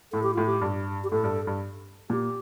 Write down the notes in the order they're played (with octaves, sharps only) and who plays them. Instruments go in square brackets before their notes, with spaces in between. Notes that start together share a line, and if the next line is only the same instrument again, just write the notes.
[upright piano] A2 [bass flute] A4
[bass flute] G4
[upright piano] A2 [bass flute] F4
[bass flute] G4
[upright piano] G2
[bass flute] G4
[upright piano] A2 [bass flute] A4
[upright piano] G2
G2
[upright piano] A#2 [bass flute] G4